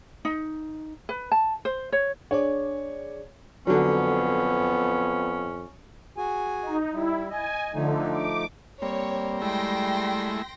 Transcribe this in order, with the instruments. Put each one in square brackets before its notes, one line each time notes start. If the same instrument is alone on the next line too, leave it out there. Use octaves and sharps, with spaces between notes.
[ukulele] D#4
B4
A5
C5
C#5
[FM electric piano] D4 G#4 D5 [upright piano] C#5
[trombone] F2 [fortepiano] D3 F#3 [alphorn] B3 [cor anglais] C#4
[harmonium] F#4 G#4 G#5
[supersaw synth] D#4
[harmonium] G3 [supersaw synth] E4
[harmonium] D#5 [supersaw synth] G#5
[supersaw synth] D3 [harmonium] F3 A3 D#4
[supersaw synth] D6
[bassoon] G3 [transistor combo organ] A#3 C4 [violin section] C#5
[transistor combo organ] G#3 A3 E4 [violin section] G5 C6 A#6